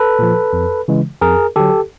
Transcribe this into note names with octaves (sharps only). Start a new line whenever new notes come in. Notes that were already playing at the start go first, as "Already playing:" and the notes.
Already playing: A4 B4
A#2 F3
F2
C#3 E3 G#3
F2 G#4 A#4
D3 F#3 G4 A4